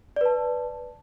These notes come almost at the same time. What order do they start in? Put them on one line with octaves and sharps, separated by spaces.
D5 B4 A5